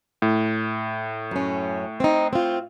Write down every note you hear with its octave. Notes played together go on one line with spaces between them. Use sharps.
A2
F#2 C#4
C4 D#4
C4 F4